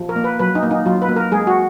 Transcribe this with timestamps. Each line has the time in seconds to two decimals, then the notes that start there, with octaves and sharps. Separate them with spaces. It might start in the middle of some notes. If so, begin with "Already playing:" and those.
Already playing: F3
0.09 A#4
0.16 A#3
0.24 B4
0.39 F#3 B4
0.55 D#4
0.63 A#3
0.71 D#4
0.86 F#3 F4
1.02 B4
1.09 A#3
1.16 A#4
1.32 G#3 G#4
1.47 F#4